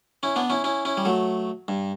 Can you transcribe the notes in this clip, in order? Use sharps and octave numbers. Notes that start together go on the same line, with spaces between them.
C#4 E4
B3 D4
C#4 E4
C#4 E4
C#4 E4
G3
F#3 A3
G2